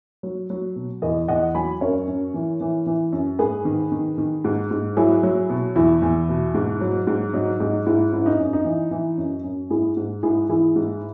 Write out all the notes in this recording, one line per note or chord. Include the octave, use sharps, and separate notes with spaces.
F#3
F#3
B2
E2 B4 D#5
E2 D#5 F#5
F#3 G#5 B5
F#2 A#4 C#5
F#2
E3
E3
E3
F#2
G#2 G#4 B4
D#3
D#3
D#3
G#2
G#2
F#3 E4 G#4
F#3
B2
E2 E4
E2
B2
G#2
F#3
G#2
F#3 D#4
G#2 D#4
G#2 E4
F#2 E4
D#4
F#2
D#4
E3
E3
F#2
F#2
G#2 E4 G#4
G#2
G#2 E4 G#4
E3 E4 G#4
G#2